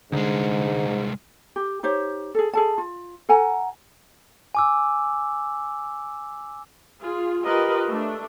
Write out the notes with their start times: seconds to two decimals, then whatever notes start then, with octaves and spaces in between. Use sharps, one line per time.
0.12 C2 G#2 D3 G#3
1.56 G4
1.83 D#4 G4 C5 C#5
2.35 G#4 A4
2.53 G#4 A4 A5
2.78 F4
3.29 A4 F#5 G#5 A#5
4.55 G#5 D6 E6
7.03 F4 G#4
7.45 F4 G4 A#4 B4 D#5
7.88 A3 D4